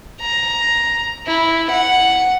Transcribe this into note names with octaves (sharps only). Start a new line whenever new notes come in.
A#5
E4
F#5